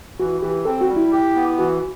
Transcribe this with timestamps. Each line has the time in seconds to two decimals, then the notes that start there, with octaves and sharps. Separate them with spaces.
0.19 E3 F#4
0.42 E3 G4
0.65 C4 A4
0.81 F#4
0.88 G3
0.96 E4
1.12 G4
1.36 B3
1.58 E3 F#4